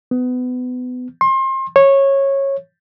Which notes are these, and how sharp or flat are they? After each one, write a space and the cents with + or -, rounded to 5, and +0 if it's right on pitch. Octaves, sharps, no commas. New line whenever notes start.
B3 +25
C6 +30
C#5 -15